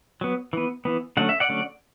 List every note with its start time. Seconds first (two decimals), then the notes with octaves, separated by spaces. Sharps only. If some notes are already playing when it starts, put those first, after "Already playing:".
0.21 F#3 B3
0.53 E3 B3
0.85 E3 B3
1.17 D3 F#3 A3 C#4 F#5
1.29 E5
1.40 D5 F#5
1.49 D3 F#3 A3 C#4